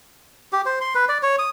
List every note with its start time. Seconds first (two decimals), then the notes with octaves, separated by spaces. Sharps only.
0.53 G4
0.66 C5
0.81 C6
0.95 B4
1.09 D5
1.23 C#5
1.39 D#6